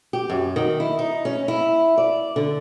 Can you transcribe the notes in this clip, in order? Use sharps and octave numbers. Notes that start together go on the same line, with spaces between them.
G4
F#2
D#3
E4
D#4
C#4
E4
D5
D3